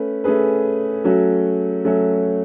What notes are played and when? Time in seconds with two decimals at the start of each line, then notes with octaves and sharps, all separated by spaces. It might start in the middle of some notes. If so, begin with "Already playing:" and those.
Already playing: A3 C#4 B4
0.24 A3 C#4 G#4 B4
1.04 F#3 A3 C#4 F#4
1.85 F#3 A3 C#4 F#4